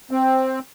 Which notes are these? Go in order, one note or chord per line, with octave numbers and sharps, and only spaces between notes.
C4